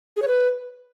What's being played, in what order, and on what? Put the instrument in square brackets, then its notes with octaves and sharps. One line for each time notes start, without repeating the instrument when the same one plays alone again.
[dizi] G#4
C#5
B4